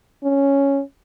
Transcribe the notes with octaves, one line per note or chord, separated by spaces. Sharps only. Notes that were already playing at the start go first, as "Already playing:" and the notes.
C#4